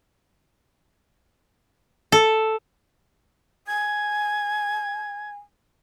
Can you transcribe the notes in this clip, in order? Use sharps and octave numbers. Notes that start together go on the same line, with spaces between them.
A4
G#5 G#6